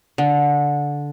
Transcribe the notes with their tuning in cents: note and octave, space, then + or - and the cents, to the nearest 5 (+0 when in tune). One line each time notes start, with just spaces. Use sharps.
D3 -15